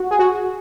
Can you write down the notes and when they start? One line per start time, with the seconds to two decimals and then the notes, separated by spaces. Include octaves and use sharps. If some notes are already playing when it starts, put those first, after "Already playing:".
Already playing: F#4
0.11 G#4
0.19 F#4